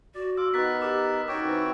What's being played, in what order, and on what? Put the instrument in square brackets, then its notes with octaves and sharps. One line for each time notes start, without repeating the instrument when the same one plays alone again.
[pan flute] F#4 [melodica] D5
[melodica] F4 D6 [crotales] E6
[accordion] D#3 B3 [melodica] A#4 [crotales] F#6 A6 B6
[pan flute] G4 [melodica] A#4 [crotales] D6 E6
[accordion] F#2 A#4 [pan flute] D#4 [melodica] F#4 C#5 G5 [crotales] D6
[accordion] E3 C4